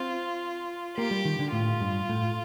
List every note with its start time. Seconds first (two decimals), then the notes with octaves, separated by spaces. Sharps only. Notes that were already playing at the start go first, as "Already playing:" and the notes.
Already playing: C4 F4
0.96 A#3 G4
1.11 G3
1.25 D#3
1.39 D3
1.52 A2 F4
1.81 G2
2.09 A2